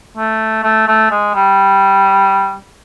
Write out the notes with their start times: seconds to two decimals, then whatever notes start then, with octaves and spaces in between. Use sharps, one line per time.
0.17 A3
0.63 A3
0.88 A3
1.11 G#3
1.35 G3